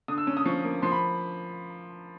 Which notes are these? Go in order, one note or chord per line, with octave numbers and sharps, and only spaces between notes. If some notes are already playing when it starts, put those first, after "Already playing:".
D3 D#6
E6
C#4
D#6
F3 C#6
A#3
F3 C6
B5